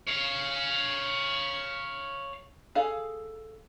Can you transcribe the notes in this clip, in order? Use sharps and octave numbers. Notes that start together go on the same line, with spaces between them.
C#5 F5
G#4 A4 F5